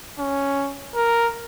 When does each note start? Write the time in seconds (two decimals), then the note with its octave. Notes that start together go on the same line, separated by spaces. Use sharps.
0.19 C#4
0.95 A#4